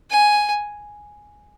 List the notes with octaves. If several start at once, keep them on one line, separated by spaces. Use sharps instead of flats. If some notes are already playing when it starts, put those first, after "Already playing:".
G#5